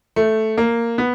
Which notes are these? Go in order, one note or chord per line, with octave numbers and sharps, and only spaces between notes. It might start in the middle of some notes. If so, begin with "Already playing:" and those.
A3
A#3
B3